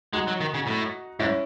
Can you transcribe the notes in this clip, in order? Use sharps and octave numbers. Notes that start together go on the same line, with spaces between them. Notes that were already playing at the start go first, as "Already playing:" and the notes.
G#3 D#4 F#4
F#3
D#3
C#3
A2
G#2 C#4 E4